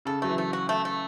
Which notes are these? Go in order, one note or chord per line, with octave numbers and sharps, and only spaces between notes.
C#3 A4
F#3 A3
E3
A3
F#4
A3
A3